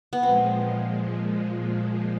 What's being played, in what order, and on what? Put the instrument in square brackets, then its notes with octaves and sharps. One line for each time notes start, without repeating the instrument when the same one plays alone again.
[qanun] B3
[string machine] A#2 F3 G#3 [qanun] C4